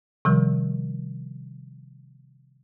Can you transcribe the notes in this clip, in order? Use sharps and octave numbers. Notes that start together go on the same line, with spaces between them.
C3 D#3 F3 G3